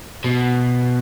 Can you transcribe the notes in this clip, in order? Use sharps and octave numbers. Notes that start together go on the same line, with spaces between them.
B2